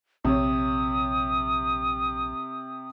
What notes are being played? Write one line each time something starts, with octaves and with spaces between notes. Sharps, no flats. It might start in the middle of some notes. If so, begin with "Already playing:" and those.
A#1 C3 C#5 D#6